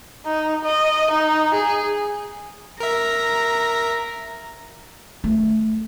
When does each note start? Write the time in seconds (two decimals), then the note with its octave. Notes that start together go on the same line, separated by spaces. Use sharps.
0.26 D#4
0.65 D#5
1.11 D#4
1.54 G#4
2.80 A#4 E5 A#5
5.24 A3